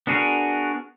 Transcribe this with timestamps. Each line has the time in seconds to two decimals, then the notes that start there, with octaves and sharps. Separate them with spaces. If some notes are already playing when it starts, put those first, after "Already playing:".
0.07 B3 D4 F#4 G#4 A#4